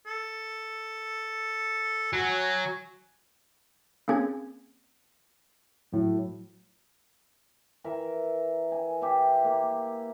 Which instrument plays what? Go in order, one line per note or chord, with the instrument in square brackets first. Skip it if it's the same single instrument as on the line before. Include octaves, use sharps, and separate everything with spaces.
[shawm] A4
[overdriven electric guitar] F#3 [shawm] G#5
[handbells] A#3 C4 C#4 G#4 G#6
[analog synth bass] A2 [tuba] F#3
[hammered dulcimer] E3 A#4 E5
G#5
E4 G4
A#3